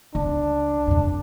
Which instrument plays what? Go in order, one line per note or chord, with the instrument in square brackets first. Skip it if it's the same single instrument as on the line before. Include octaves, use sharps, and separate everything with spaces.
[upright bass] C#2 [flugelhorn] D4
[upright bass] F2 C#3